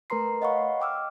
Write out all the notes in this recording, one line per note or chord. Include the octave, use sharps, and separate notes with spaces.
A3 A#4 B4 A#5 C6 C7
C#5 D#5 F5 F#5 B5 C#6
G5 D6 E6 F6